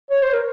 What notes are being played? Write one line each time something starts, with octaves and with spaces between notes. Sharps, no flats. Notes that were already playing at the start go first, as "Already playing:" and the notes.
C#5
C5
A#4